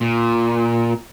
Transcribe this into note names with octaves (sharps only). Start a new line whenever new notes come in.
A#2